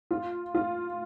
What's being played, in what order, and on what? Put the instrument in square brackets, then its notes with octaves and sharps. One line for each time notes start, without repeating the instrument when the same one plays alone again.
[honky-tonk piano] F4
F4